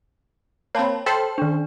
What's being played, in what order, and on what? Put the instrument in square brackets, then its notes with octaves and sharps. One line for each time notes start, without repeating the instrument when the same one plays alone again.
[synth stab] A#3 C4 [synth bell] C#5 A5 B5
[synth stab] A4 C5 E5 [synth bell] G5
[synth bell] D#3 D4